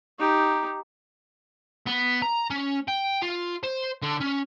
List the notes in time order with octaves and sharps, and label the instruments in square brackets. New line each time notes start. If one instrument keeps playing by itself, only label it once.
[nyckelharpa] D#4 G4
[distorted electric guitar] B3
A#5
C#4
G5
F4
C5
D3
C#4